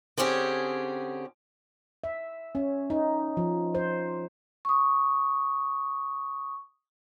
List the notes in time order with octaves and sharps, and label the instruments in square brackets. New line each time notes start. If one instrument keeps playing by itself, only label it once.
[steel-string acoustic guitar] D3 C4 C#4 G4 G#4
[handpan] E5
C#4
D#4
F3
C5
[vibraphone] C#6 D#6